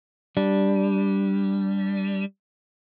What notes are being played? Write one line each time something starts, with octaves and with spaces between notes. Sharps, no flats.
G3 D4